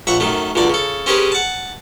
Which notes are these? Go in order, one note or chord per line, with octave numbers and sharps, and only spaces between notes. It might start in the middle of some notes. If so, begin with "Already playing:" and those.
A#1 E5 F#5 C#6
F#2 D#3 A3
C#2 F#2 D3 D5
C#3 A4
C4 C#4 G4 G#4 A#4 B4
F#5 A5